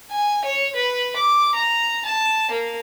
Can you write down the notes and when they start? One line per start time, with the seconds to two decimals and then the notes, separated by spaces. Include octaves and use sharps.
0.11 G#5
0.45 C#5
0.76 B4
1.16 D6
1.55 A#5
2.06 A5
2.51 A#3